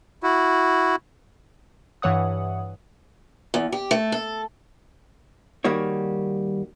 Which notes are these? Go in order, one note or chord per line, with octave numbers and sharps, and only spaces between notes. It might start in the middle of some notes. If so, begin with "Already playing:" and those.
E4 F#4
G2 E3 C#5 F#5 D#6
E2
G4
A3
A4
D#3 G3 A#3 F#4 C#5